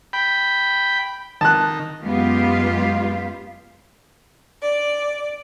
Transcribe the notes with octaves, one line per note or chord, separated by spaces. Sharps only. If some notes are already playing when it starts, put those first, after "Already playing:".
G5 B5
D#3 A5 F#6
F#2 G#3 B3 F4 G4 F5
D5